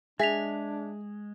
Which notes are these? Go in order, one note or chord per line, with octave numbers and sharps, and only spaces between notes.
G#3 D4 G#4 E5 B6 F7